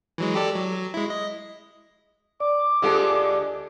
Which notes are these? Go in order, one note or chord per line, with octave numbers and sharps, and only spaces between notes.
E3 F#3 G#3
G4 A4 D5
F#3
G#3 E4
D#5
D5 D6
D2 D3 G#3 F4 G4 A4